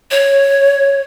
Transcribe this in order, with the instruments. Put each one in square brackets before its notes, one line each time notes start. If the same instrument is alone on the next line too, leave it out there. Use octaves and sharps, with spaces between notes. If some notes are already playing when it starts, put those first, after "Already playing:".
[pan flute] C#5